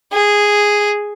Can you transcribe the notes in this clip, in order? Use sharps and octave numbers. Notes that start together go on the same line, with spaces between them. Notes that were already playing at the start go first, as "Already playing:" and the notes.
G#4